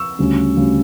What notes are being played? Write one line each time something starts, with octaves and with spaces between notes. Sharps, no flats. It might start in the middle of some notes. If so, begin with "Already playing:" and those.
Already playing: C#6 E6
D2 C#3 G3 C#4
D2 C#3 G3 C#4